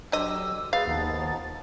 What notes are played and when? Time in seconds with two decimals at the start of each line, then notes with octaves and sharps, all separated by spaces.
0.12 D3 F#3 G4 D#5 E6
0.73 G#3 G#4 B4 F5 A6
0.87 D#2 F3 B3 D#4